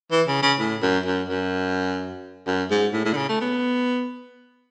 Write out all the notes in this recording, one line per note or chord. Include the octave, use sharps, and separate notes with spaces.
E3
C#3
C#3
A2
F#2
F#2
F#2
F#2
G#2
A2
A2
D3
C#3
A3
B3